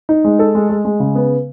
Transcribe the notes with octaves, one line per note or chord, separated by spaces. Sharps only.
D#4
G#3
A4
G#3
G#3
G#3
C#3
B3